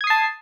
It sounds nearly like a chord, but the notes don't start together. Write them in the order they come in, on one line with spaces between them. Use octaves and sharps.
G#6 D#6 C7 A5